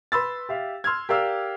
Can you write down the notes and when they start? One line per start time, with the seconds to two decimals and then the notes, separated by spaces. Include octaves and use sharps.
0.12 B4 B5 C6 E6 A6
0.49 G4 E5 F5
0.84 C6 E6 F6 G#6
1.09 G4 A#4 D5 F5 E6 F6